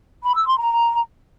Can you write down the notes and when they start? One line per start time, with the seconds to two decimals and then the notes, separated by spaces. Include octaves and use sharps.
0.23 B5
0.35 E6
0.46 C6
0.58 A#5